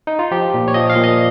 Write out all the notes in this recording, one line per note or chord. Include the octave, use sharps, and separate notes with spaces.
D#4
F4
F3 G4
A#2
C#5
F3 D#5
F5
A#2
D#5